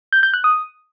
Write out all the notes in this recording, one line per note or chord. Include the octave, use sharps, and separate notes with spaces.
G6
G6
F#6
D#6